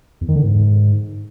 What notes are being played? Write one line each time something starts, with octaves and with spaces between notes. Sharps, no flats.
E2
D#3
D3
G#2